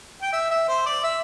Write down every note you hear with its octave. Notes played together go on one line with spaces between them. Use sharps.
G5
E5
E5
C5
D5
E5